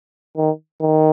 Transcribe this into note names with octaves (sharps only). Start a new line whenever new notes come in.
D#3
D#3